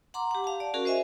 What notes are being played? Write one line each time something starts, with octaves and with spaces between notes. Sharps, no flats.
F#5 A#5 C6 D6
G4 F#5
F5 A5
D5
C#4 F#4 G#4 A#4
C5 D#5 E5 G#5